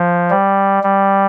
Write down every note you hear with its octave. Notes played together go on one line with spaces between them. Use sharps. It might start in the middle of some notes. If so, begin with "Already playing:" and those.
Already playing: F3
G3
G3